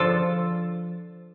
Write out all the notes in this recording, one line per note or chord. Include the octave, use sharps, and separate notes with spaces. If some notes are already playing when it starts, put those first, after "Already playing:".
Already playing: F3 D4 F4 A4